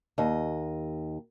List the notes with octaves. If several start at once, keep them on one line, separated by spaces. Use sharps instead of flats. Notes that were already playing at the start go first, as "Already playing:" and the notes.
D#2 D#5